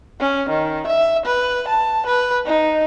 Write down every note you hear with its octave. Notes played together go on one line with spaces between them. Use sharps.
C#4
D#3
E5
B4
A5
B4
D#4